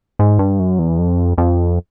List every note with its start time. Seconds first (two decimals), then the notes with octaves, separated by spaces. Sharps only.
0.19 G#2
0.39 G2
0.59 F#2
0.79 E2
0.99 F2
1.38 F2